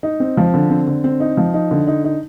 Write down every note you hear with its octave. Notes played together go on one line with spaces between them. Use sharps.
D#4
C4
F3
D3
C4
D3
C4
D#4
F3
D#4
D3
D#4
D#4